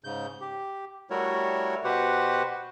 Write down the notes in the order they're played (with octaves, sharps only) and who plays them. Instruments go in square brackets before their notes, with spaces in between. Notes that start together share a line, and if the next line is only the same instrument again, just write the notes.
[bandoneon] G#2 C#3 G6
G4
G3 A3 E4 F#4 A#4 C#5
B2 F#4 G4 B4 C5 F#5